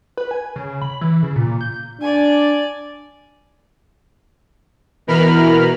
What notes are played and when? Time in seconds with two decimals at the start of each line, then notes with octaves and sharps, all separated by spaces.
0.17 B4
0.31 G#5
0.56 C#3
0.82 B5
1.01 E3
1.23 C#3
1.36 A#2
1.61 G6
2.01 D4 D5 G#5
5.07 B2 E3 A#4 B5 F6